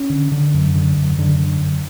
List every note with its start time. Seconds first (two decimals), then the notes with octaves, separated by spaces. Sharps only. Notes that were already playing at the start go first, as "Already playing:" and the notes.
Already playing: C#4
0.10 D3
0.32 D3
0.54 F#2
0.75 D3
0.97 F#2
1.18 F#2 D3
1.39 D3
1.61 F#2